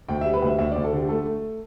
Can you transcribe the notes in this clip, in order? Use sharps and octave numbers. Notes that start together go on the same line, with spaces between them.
D2 G5
G3 E5
B4
D2 E5
D2 E5
D2 D5
A4
D3 G4
A3 A4
A3